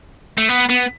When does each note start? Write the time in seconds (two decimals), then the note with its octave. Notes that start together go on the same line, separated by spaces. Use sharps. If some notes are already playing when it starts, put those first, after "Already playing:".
0.38 A3
0.49 B3
0.70 B3